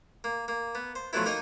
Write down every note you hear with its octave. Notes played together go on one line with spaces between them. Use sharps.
A#3
A#3
B3
C5
F3 F#3 A3 B3 E4
A#3 D#4 A#4 D#5 G5 G#5